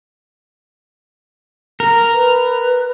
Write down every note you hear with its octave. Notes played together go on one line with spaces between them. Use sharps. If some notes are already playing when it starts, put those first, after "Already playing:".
A#4
B4